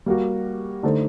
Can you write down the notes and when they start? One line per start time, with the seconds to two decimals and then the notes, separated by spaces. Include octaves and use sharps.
0.06 G3 A#3 F#4
0.83 D3 A3 D#4 A4 C5